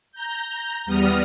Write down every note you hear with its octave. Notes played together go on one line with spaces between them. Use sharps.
A#5 G6
E2 G3 B3 D#6 F6 A#6